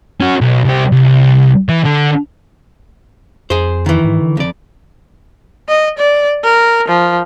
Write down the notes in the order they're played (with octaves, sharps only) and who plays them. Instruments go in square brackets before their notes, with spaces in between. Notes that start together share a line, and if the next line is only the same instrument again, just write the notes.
[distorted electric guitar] C#4 F#4
B1
C2 G4
C2
E3
D3
[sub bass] F2 [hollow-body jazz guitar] G#4 C5
[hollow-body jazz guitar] D#3 E3
[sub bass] G#2
D3
[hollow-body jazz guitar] F2 D5
[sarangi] D#5
D5
A#4
F3